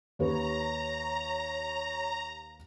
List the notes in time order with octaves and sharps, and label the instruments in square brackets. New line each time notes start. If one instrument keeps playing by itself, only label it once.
[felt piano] D#2 G4 B4 [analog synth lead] C#5 [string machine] A#5